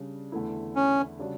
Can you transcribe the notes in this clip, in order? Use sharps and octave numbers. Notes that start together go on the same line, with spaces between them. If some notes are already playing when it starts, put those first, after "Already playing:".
Already playing: C#3 G3 D4
E2 D3 A3 E4
C#4
C#3 G3 D4 F#4